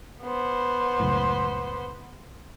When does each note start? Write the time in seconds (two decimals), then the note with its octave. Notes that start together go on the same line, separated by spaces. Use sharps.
0.23 B3 C5
1.00 C#2 F#2 A2